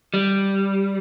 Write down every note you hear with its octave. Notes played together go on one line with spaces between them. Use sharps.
G3